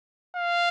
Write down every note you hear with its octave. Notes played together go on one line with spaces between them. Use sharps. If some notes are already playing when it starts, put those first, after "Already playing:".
F5